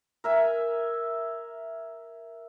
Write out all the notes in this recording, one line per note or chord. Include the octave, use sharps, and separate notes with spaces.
A#4 E5 G#5